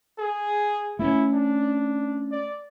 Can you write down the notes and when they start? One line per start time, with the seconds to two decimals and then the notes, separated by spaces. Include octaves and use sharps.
0.18 G#4
0.99 A3 B3 C#4 E4
1.33 D4
2.31 D5